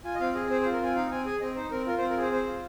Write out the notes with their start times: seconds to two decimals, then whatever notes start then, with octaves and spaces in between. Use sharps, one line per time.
0.04 F4 G#5
0.15 D#5
0.20 C4 F5
0.34 G#4 D#5
0.50 C4 C5
0.61 C5
0.65 F4
0.73 A#4
0.81 C4 G#5
0.95 D#4 F5
1.11 C4 G#5
1.26 G#4 G#5
1.41 C4 D#5
1.56 D#4 C5
1.71 C4 A#4
1.87 F4 A#4
1.98 C5
2.01 C4
2.10 A#4
2.17 G#4 C5
2.32 C4 C5
2.47 F4